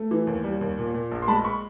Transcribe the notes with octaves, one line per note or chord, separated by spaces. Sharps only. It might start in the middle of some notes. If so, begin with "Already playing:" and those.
Already playing: A3
E3
D#2
G3
D#2
A#2
A#2
A#1
C6
G#3 A5 B5
B5 C#6